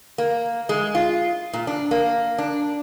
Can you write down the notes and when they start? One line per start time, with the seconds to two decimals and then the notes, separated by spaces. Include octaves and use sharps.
0.18 A#3
0.69 G#3
0.95 F4
1.53 A#2
1.67 D4
1.91 A#3
2.38 D4